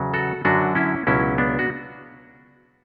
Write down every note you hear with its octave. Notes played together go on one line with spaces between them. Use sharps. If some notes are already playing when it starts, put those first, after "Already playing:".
Already playing: E2 C#3 F#3
F#4 A4
F#2 D3 F#3 D4 F#4
C#4 E4
C#2 B2 F#3 C#4 E4
B3 D4
F#4